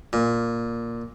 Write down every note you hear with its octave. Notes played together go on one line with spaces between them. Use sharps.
A#2